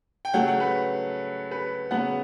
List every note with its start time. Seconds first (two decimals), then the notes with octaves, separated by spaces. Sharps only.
0.25 G5
0.34 C#3 F#3 A3 F#5
0.48 F#5
0.60 B4
1.51 B4
1.91 C#3 F#3 B3 F#5